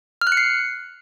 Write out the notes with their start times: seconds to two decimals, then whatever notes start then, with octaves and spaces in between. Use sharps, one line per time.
0.21 F6
0.27 F#6
0.32 C#7
0.37 C7